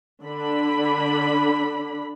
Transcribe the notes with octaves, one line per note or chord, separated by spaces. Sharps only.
D3 D4 B5